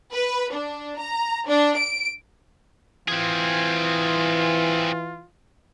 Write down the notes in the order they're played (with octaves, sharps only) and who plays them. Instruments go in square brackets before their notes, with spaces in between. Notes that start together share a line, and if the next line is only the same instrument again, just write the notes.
[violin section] B4
D4
A#5
D4
D7
[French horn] E3 [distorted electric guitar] C4 G#4 [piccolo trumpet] F4